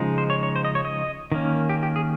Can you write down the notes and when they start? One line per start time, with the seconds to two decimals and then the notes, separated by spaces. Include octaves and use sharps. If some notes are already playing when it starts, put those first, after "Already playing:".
Already playing: C#3 F3 G#3 D#4
0.18 C5
0.30 C#5
0.43 C#5
0.56 C5
0.65 D#5
0.75 C#5
0.85 D#5
1.32 D#3 A#3 C#4
1.69 G4
1.83 G4
1.96 G#4